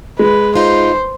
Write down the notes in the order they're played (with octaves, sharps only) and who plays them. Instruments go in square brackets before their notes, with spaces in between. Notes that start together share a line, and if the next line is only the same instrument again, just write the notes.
[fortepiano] G#3 [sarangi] B4
[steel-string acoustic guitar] D#4 F4 [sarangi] C5